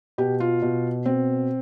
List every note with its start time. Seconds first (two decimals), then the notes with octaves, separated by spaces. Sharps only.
0.18 B2 G4
0.40 F4
0.62 B2
1.06 B2 C4